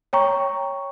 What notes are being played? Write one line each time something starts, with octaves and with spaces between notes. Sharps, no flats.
C#5 G5 A#5 C#6